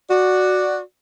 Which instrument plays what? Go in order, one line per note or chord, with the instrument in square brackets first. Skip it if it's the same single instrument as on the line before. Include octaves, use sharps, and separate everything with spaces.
[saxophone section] F#4 D5